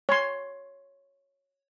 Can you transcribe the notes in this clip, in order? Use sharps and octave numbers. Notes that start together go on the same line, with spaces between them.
C#5 C6